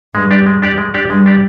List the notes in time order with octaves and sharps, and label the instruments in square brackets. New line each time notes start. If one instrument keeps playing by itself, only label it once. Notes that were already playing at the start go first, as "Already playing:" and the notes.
[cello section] G2 [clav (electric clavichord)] G#3
[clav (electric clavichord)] D4 G4 D5
G#3
D4 G4 D5
G#3
D4 G4 D5
[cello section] G2 [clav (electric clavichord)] G#3
[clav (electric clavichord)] D4 G4 D5